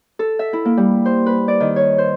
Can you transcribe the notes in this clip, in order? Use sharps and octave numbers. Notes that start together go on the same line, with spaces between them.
A4
E5
E4
A#3
G3
C5
B4
D5
D#3
C#5
C5